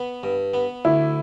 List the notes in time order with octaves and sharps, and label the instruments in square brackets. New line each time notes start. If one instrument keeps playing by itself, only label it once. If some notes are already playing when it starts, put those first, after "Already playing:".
Already playing: [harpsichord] B3
G2
B3
[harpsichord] D2 [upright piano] E4